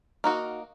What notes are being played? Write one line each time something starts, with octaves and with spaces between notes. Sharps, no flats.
A#3 D#4 F#4